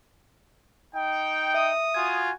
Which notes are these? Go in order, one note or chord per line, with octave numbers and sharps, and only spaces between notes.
D#4 G5
E5 D#6
F4 F#4 G#5 G#6